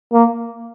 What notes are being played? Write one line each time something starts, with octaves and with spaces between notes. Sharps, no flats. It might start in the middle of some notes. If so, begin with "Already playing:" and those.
A#3